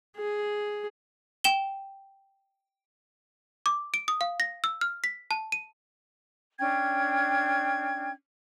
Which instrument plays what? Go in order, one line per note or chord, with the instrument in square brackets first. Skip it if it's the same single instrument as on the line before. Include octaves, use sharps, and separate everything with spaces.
[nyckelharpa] G#4
[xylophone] G5 E7 G7
D6
D7
D#6
F5
A#6
E6
F6
B6
A5
D#7
[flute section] C#4 D4 G5 G#6